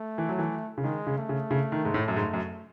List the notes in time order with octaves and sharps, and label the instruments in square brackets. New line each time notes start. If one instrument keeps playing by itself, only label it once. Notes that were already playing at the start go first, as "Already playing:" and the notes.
Already playing: [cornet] A3
[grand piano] E3
F#3
E3
C#3
[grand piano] D#3 [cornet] G#3
[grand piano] C#3
[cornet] A3
[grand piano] C#3
C#3
D#3
G#2
A2
F#2
G#2
F#2